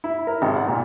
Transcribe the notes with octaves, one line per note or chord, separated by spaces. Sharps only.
E4
A#4
G#1
F#5
A#2